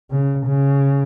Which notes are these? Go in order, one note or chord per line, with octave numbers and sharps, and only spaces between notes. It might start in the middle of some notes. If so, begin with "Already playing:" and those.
C#3
C#3